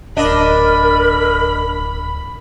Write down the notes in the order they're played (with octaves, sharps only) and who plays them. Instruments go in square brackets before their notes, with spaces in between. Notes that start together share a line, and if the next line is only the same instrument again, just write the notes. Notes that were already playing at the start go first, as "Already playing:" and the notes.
[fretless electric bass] D1 [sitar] D4 D#5 [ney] A#4 [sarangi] B5